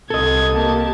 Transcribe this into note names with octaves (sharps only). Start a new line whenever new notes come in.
C2 A4 D#5 G#6
A#3 G4 A5